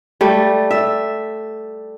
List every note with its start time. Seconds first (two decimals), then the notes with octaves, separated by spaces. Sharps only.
0.21 G3 A3
0.71 E5